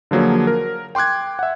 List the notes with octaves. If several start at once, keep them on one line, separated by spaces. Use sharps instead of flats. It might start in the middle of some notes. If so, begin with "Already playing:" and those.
D3 F3 F#3 A#3 G#4
A#4
G5 C6 D6 F#6 G#6
E5 F#5